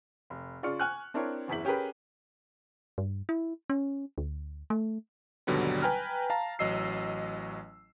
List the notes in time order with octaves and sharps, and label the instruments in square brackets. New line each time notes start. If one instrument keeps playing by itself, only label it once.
[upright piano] F1
C#3 F4 D5 C#6 F6 C#7
G#5 C#6 F6 F#6
C4 D4 E4 A#4 C#5
F#1 E2 E4 B6 F#7
C#4 G4 G#4 A#4 B4
[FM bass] G2
E4
C#4
D2
A3
[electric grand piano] G#1 D#2 B2 D3 F#3 G3
B4 G5 G#5 A#5 F6
F5 A5 A#5
A1 F#3 D#5 E6 C7